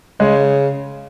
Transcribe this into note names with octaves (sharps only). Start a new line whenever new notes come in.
C#3 G#3